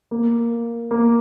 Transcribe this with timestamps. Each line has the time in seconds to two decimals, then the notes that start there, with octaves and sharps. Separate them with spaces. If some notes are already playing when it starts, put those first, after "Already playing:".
0.11 A#3
0.91 A#3